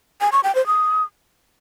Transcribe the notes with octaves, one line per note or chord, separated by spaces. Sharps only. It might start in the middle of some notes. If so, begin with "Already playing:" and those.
G#5
C#6
G5
C5
D#6